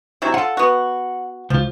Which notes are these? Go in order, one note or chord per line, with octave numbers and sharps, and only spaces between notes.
C3 F#3 E4
F4 A4 F#5
B3 F#4
C#2 F3 F4